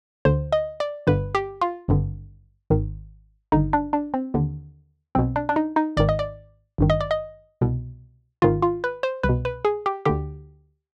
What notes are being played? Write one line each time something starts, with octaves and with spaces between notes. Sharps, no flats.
D2 D3 C5
D#5
D5
G1 G2 D3 B4
G4
F4
G#1 G2 D3
G#1 G#2 D#3
G#1 G2 D3 D#4
D4
D4
C4
D#2 D3
B1 B2 C4
D4
D4
D#4
D#4
G#1 G#2 D#3 D5
D#5
D5
G#1 G2 D#3
D#5
D5
D#5
C2 B2
G#1 G#2 D#3 F4
F4
B4
C5
C2 B4
B2
B4
G#4
G4
D2 D3 G4